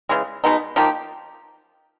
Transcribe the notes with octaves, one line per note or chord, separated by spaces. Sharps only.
C#3 E3 G#3
B2 G#3 B3 D#4
F3 A#3 D#4 G4